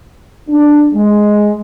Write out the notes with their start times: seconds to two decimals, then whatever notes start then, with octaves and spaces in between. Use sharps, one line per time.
0.49 D4
0.94 G#3